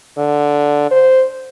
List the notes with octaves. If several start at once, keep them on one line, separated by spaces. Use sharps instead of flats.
D3
C5